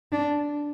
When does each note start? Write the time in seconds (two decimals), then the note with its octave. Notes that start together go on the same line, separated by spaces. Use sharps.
0.12 D4